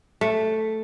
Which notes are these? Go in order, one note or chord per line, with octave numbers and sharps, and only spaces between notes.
A3